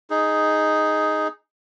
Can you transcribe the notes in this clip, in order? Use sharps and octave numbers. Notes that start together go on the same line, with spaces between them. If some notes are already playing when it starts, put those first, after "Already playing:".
D#4 G#4